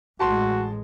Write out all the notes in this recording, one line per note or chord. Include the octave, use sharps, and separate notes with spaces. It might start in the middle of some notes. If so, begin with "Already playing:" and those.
A1 A2 G#3 F#4 A5 C6